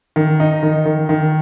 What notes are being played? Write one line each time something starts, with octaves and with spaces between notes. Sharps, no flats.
D#3
D#4
D#3
D#3
D#3